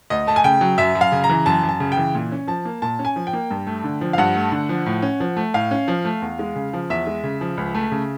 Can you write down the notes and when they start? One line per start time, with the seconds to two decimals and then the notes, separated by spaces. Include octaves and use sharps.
0.10 D2 D#5
0.27 A3 A5
0.36 G#5
0.44 C#3 G5
0.61 F#3
0.78 F#2 E5
0.95 F#2
1.01 F5
1.12 C#3
1.24 A#5
1.29 E3
1.46 F#2 A5
1.63 F#2
1.69 A5
1.80 C#3
1.92 G5
1.97 E3
2.15 A#2
2.32 C#4
2.48 F3 A5
2.65 A#3
2.82 A#2 A5
2.99 C#4
3.05 G#5
3.16 F3
3.27 G5
3.33 A#3
3.51 G2
3.67 A3
3.84 D3
4.01 F3
4.13 F5
4.18 G2 F#5
4.35 A3
4.52 D3
4.69 F3
4.86 A2
5.02 C#4
5.20 F3
5.37 A3
5.54 A2 F5
5.71 C#4
5.88 F3
6.05 A3
6.22 E2
6.39 G#3
6.56 C#3
6.73 F3
6.90 E2 E5
7.07 G#3
7.24 C#3
7.41 F3
7.58 C#2
7.75 A3
7.92 C#3